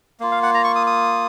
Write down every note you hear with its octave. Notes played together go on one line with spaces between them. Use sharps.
A#3 F4
F5
F#5
A#5
C#6
D#6
D#6